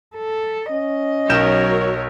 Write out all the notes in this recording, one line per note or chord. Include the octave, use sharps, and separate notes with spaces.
A4
C#4 D#5
B1 F#3 A#4 C#5 G6 E7